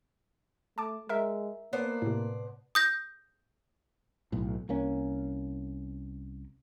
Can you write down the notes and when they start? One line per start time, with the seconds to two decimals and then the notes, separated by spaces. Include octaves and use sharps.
0.78 A3 A5 D6
1.09 G#3 A#4 E5
1.73 A#3 B3 D4 C5
2.02 A2 C3
2.75 D#6 G6 A#6
4.32 B1 A2
4.69 C2 A#3 C#4